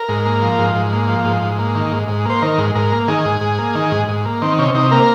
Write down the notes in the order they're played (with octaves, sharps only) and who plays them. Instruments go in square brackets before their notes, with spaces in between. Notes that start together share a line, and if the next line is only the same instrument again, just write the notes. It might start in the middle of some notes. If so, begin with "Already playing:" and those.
Already playing: [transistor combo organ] A#4
G#2
A#3
F3
G#2
G#2
A#3
F3
G#2
G#2
A#3
D#3
G#2
G#2
A#3 C5
D#3 A#4
G#2
G#2 A#4
A#3
D#3 G#4
G#2
G#2
A#3
D#3
G#2
G#2
A#3
D#3 C4
C3 C#4
C3 D#4
A#3 A#4